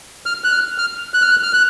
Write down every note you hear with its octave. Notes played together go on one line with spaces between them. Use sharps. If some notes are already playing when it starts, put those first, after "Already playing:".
F6
F#6
F6
F6
F#6
F6
F#6
F6
F#6